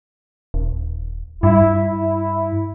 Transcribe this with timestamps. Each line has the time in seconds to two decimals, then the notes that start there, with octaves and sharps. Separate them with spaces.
0.54 D#1
1.43 G2 E4
1.81 E4